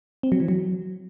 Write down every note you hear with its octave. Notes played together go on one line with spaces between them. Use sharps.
C4
F#3
E3
F#3